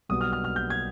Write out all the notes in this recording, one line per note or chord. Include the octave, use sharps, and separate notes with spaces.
B1 B2 G3 B3 D#6
F6
F6
F6
G6
G#6